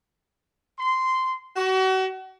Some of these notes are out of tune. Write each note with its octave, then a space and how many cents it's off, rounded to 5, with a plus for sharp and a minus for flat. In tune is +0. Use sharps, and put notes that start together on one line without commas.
C6 -10
F#4 +35